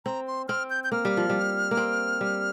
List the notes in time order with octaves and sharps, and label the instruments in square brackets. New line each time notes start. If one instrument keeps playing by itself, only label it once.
[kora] C4 [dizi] A#5
[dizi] C6
[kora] C4 [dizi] F6
[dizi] G6
G6
[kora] A#3 [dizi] F6
[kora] G3
F3
G3
A#3
C4
G3